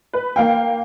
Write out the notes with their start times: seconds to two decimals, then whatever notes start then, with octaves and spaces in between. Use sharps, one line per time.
0.14 B4
0.36 A#3 F5 G5